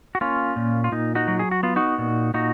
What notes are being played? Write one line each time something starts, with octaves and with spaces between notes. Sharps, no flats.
F#4
A#3 C#4 F4
A#2
F4
A#2 D#4
D#4 F#4
F#3
G#4
F#4
B3 F4
D#4 F#4
A#2
A#2 D#4 F#4